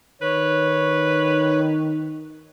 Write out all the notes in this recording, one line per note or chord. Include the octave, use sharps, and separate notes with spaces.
D#3 B4 C#5